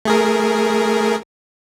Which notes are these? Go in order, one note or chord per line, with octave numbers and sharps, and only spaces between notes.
A3 G#4 A#4